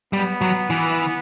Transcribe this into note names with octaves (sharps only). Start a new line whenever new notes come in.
G3 B3
F#3
E3